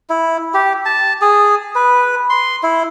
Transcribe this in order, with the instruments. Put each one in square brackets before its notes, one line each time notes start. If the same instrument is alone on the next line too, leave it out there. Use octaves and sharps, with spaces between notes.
[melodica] E4
G4
A5
G#4
B4
C6
E4